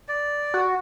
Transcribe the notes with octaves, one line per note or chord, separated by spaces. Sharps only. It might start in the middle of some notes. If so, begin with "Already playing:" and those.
D5
F#4